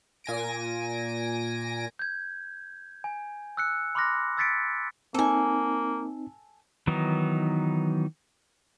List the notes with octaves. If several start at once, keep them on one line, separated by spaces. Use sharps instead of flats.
A#2 G#5 A#6 D7
G6 G#6
G#5
E6 F#6 C#7
B5 C6 D6 F6 F#6 A#6
E6 G#6 A6 B6 C#7 D7
A#3 C4 D#4 A4 G#5
D#3 E3 F#3 B3 D#4